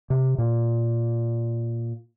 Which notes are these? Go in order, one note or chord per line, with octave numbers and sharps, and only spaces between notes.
C3
A#2